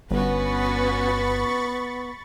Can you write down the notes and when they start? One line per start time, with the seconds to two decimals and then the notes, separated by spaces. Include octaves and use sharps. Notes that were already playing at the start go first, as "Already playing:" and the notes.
0.11 G1 B3 C#4 F#4 B4 B5 C#6 A6